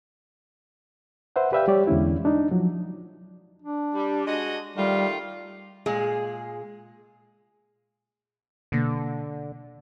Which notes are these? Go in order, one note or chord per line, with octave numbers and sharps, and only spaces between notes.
B4 C5 E5 F#5
G4 B4 D5 E5 F5 G5
G3 G4 C#5 D5
E2 D3 G#3 C#4 E4
D4 D#4
F3 F#3
D4
G3
G#3 F#4 D#5
D#3 G3 A3 F4
A#2 G#3 G#4
B2 D3 A#3 A#6